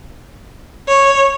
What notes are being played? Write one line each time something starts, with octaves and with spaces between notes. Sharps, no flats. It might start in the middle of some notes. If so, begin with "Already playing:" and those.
C#5